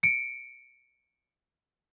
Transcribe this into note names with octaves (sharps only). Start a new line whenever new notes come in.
C#7 D7